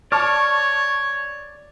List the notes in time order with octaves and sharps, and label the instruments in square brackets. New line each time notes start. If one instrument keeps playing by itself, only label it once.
[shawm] C#5 [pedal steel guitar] D5 [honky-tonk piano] A5 C#6 F6